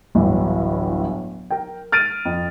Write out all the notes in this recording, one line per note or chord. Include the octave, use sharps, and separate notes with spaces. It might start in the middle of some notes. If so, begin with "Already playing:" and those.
D1 G1 A2 E3
A#4 G5
F6 A6 D7 D#7
F2